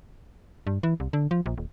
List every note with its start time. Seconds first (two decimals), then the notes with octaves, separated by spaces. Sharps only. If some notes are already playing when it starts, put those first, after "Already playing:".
0.67 G2
0.83 E3
1.00 C2
1.13 D3
1.31 F3
1.46 A#1
1.58 D#1